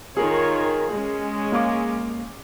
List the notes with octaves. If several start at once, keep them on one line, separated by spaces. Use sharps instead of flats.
D#3 F4 G#4 A#4 C#5
G#3 C#4
A#3 F5 D6